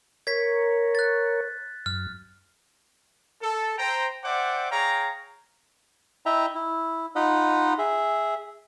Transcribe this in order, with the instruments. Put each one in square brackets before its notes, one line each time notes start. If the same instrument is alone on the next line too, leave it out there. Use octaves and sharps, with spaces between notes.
[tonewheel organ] A#4 C#5 [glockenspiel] G#6 B6
[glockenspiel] F#6 A6
[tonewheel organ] F#2 [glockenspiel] F6
[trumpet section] A4
C5 G5 A#5
C5 D5 E5 F#5 G5 D6
G#4 C#5 F5 G5 A#5
[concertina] E4 D#5 E5 G5 A#5
E4
D#4 F4 D#5 F#5 B5
G#4 E5